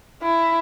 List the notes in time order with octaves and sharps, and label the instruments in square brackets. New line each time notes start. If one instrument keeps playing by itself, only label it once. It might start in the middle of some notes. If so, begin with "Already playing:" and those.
[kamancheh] E4